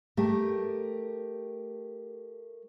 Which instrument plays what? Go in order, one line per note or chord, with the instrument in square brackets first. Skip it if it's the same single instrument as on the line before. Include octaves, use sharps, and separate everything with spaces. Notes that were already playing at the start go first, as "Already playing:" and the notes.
[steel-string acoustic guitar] A3 G4 A#4